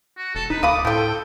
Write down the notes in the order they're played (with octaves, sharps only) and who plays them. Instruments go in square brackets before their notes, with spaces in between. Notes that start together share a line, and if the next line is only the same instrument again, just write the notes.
[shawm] F#4
[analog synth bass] E1 [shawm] A4
[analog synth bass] F1 [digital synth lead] D#4 [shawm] B4
[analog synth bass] D2 [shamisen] A3 F5 B5 [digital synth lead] D6 [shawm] D#6
[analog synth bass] A2 [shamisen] F3 E4 [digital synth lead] A4 [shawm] G5